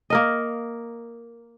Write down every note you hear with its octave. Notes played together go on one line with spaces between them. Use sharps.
A#3 A#4 D#5